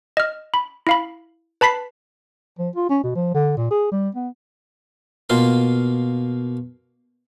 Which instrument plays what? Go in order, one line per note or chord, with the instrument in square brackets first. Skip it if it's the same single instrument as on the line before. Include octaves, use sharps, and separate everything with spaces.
[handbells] D#5 F6
B5
E4 F5 B5
B4 A5 B5 B6 C7
[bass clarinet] F3
F4
C#4
B2
F3
D3
A#2
G#4
G3
B3
[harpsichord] B2 A#3 F4 C6